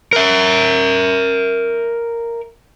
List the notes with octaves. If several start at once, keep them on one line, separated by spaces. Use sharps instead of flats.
A#4 E5